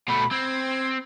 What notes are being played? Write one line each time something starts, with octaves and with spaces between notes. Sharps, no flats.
B2 A3 B5
C4 G#6